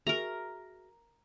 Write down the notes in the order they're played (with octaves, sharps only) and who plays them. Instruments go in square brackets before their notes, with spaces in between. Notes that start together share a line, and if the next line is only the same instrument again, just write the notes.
[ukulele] F#4 G#4 E5 [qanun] A#4 A#5